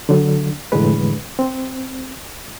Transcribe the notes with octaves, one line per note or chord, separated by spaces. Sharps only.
D3 F#3
F2 A2 D3 E3 G#3 B4
C4